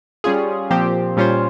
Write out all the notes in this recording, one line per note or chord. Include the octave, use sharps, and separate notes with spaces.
G3 C#4 F4 G#4
A#2 F3 C4 G4 C5
A#2 G3 C#4 F4 C5